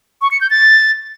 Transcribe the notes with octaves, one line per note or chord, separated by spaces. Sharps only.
C#6
C#7
G6
A6